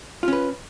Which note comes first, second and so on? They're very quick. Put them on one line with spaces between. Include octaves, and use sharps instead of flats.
F4 C#4 B4